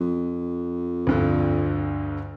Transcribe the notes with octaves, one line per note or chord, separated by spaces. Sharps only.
F2
D2 G2 D3